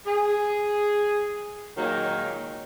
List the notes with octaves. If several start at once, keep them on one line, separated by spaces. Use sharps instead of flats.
G#4
A#2 D#3 F#3 G#3 A#3 C#5